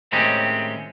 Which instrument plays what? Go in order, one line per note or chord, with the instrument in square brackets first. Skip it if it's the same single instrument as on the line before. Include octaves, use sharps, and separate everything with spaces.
[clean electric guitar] A2 D#3 G#3 C4 C#4 G4